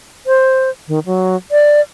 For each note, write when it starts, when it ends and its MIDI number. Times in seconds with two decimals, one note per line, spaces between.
0.27 0.70 72
0.88 0.99 51
1.06 1.36 54
1.51 1.81 74